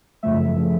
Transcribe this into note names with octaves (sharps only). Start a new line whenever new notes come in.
F#2 C#3 F3 A3 E5
C#3 F3 A3